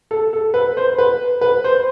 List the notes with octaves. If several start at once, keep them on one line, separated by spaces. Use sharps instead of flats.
A4
A4
B4
C5
B4
B4
C5